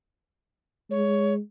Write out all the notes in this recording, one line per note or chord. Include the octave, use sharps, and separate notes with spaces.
G#3 C#5